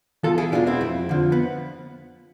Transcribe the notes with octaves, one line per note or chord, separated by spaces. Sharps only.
E2 F4 A4
E4 G#4
B2 G#3 D4 F4
C4 E4
F2
D3 F3
B3